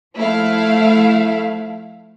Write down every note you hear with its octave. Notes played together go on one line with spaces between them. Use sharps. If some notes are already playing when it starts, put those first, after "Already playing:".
F3 A3 E4 F5